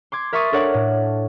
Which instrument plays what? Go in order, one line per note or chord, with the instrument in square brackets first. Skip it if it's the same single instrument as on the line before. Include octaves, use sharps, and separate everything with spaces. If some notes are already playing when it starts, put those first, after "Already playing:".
[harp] C6 D6 G#6
A#4 E5 C6 C#6 D#6 A6
D4 A4 A#4 C#5 D5 F#5
A2